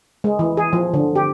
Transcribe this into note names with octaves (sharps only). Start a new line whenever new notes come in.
G#3
E3
G#4
F3
D3
G4